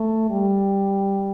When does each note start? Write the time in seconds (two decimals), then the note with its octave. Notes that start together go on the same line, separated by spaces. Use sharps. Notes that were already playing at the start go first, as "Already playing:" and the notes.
Already playing: A3
0.30 G3